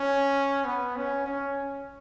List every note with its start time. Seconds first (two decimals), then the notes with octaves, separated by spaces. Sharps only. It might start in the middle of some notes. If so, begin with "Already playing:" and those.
Already playing: C#4
0.65 B3
0.96 C#4
1.26 C#4